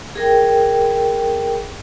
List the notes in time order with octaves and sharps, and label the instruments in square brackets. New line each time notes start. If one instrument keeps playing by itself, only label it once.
[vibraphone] G#4 A#4 G5